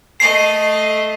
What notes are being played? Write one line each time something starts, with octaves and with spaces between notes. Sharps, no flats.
A3 D#5 C7